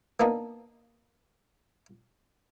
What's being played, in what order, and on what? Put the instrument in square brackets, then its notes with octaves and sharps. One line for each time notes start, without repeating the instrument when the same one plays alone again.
[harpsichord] A#3 B3 D4 D#4